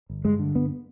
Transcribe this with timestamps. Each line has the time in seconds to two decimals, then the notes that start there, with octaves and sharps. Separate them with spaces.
0.10 G1
0.25 G2 G#3
0.39 D3
0.55 G2 B3